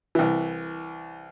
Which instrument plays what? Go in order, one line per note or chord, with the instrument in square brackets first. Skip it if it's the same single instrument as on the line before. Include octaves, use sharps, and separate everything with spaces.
[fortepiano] C2 E3